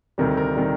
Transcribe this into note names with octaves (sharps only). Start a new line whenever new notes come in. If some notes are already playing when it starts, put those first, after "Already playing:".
D2 C3 D#3 G3 A#4
A#4
C3 D#3 G3